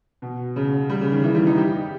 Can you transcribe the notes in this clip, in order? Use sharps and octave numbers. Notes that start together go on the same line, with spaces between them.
B2
C#3
G3
C#3
D#3
E3
G3
D#4
G4